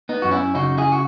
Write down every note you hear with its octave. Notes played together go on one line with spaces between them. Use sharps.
B3 D#4
F#2 F#4
C#4 E4
C#3 D#4 F#4
E4 G#4
F#4